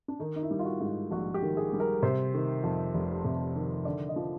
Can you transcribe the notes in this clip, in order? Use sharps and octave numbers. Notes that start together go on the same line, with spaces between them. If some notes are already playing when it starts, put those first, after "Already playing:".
D4
D#3 D#4
D#4
E4
G3
F4
F#4
G#2
F#4
A#1 F#4
G4
D#3
G#4
G3
A#4
C3 C5
D#3
F2
F1
C3
D#3
D3 D5
D#5
F3